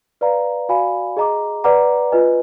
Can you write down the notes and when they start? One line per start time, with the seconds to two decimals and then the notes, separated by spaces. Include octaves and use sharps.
0.21 B4 D5 F5 A#5
0.69 F#4 D5 F5 G#5 B5
1.17 G#4 D#5 A#5 D6
1.64 B4 D5 F#5 A#5 D6
2.12 F4 B4 D#5 G#5